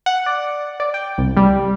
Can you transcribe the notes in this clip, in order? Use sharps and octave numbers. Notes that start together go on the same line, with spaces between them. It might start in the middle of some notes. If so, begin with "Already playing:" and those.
F#5
D5
D5
G5
C2
G3